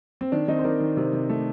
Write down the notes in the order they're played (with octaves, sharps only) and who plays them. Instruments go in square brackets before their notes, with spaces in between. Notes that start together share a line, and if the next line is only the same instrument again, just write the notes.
[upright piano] C4
D#3 D4
D#3 C4 D#4
C5
D#3 A#4 D5
D#3
C3
C3
A3